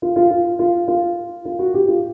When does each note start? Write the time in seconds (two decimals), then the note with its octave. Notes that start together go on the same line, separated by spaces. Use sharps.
0.02 F4
0.16 F4
0.31 F4
0.59 F4
0.88 F4
1.45 F4
1.59 F#4
1.74 G4
1.88 F4